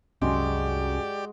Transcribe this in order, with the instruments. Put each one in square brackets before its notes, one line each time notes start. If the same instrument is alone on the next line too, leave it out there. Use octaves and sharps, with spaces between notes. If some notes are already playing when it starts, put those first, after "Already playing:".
[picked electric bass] C2 [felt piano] F#2 [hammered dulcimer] G#3 F#4 [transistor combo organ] G4 D5